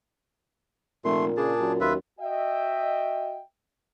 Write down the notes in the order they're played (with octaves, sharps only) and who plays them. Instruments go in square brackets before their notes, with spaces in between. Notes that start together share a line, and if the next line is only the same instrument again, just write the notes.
[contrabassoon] F1 [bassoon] A#2 [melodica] A3 C6
[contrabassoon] C#3 [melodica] D4 G#4 A5
[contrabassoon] F#2
[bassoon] D#2 [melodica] F4 B4 E5
[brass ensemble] F#4 D#5 E5 G5